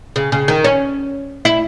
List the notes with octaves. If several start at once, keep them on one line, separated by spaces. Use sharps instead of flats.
C#3
C#3
D#3
C#4
E4